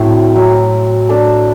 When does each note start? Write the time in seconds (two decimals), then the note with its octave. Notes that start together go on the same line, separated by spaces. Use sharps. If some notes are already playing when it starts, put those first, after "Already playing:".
Already playing: A2 F#3 C4 E4
0.35 F#3 C4 E4
1.09 D4 A4 E5